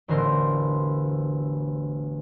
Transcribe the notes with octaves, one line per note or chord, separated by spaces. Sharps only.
E1 A1 D3 A#4 C5